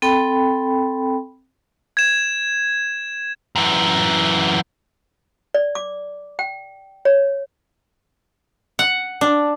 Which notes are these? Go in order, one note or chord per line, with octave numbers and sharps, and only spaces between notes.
C4 A4 G5 B5
G#6 E7
F#2 E3
D5
D6
G5
C#5
F#5
D4